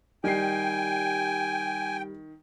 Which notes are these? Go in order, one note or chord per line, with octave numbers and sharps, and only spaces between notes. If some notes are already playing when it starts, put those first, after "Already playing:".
D#3 G3 G5 G#5 C7